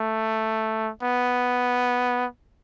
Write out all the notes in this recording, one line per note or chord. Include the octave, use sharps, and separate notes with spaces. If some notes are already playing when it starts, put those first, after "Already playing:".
Already playing: A3
B3